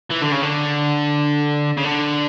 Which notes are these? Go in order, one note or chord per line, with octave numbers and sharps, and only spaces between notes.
E3
D3
C#3
D3
C#3
D3